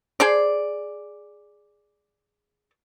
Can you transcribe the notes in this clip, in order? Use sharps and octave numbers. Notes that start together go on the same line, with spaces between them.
G#4 C5 D5